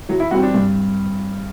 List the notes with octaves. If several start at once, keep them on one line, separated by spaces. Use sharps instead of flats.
E3 F#3
E4
G3 C4 F#4
D4
G2